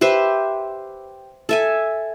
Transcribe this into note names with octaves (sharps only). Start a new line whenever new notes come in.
G4 B4 C5 E5
A4 E5 G#5